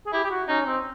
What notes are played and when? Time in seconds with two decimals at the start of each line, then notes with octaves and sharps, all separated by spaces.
0.07 G#4
0.13 E4 G4
0.24 G4
0.31 F#4
0.48 C#4 D#4
0.66 C4